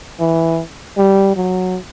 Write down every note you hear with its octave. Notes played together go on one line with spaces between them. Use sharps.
E3
G3
F#3